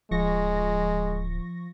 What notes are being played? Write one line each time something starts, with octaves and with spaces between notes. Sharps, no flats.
D1 F3 G#3 C#6 A#6